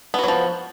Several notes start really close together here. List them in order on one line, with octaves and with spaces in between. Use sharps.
B3 F#4 F#3 F3